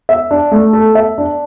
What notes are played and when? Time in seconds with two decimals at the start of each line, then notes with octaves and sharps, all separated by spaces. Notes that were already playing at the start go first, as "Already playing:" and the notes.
0.09 E5
0.31 D4
0.52 A3
0.73 A4
0.95 E5
1.18 D4